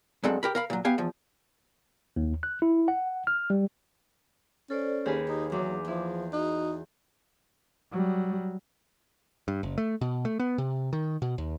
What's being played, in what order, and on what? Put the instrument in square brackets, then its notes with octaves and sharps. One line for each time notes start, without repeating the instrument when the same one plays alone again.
[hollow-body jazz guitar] G2 F#3 G#3 C4 A4 F#5
G4 A#4 B5
A#4 F5 B5
A#2 F#3
B3 G4 F5 G#5
E2 F3
[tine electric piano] D#2
F#6
E4
F#5
F6
G3
[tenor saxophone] C#4 [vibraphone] A4 C5 D5
[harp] D#2 G#4 B4 [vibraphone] G4
[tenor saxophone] D#4
[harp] E2 [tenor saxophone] F#3 [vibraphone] D6
[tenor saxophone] F3 [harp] E4
[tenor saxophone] D#4 [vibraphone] F#4
[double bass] F#3 G3
[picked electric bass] G2
F#1
A3
B2
A3
B3
C3
D#3
B2
D#2